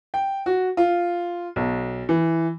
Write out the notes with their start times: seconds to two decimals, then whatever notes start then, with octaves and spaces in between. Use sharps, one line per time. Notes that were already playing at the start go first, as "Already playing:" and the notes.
0.14 G5
0.46 F#4
0.77 F4
1.56 B1
2.09 E3